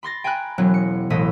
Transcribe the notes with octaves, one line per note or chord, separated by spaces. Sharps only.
B5 C6 A6 A#6
G5 G#5 A#5 B5 F#6
E1 B2 F#3 B3 C#4 F#6
C#7
E1 A1 D#5 B6